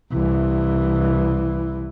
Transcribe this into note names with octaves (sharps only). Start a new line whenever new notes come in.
C2 E3